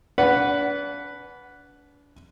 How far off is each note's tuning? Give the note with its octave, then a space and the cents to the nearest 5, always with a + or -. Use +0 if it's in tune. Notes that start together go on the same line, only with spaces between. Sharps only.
D4 -35 B4 +0 F#5 +0